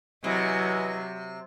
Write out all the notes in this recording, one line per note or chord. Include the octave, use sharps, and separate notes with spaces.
C3 E3 F#3 D#5 G#5